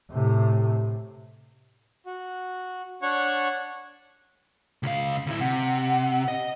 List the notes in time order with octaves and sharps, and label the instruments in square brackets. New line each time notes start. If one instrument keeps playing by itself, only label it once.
[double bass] A2 C3
[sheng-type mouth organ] F#4
D4 C#5 F#5 C#6
[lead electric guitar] C#2 F5
D2 E4
[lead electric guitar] C3 [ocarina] F#5
[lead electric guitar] D#5